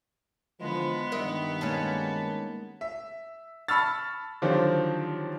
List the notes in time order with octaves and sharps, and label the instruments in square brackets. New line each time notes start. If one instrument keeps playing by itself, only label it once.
[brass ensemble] D3 E3 F3 [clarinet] G#3 [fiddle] B3
[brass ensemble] G2 D#3 [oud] A#4 D#5 E5
[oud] G#3 A#3 C#4 [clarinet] A5
[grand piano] E5
A5 B5 C#6 E6 F6 A6
D3 D#3 F3 F#3 C4 G4